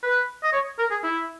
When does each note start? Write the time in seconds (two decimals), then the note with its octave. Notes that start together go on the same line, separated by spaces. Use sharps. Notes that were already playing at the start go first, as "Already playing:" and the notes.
0.03 B4
0.43 D#5
0.53 C#5
0.79 A#4
0.91 G#4
1.03 E4